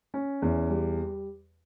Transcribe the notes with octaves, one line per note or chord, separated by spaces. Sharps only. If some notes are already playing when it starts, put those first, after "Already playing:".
C#4
E2
G3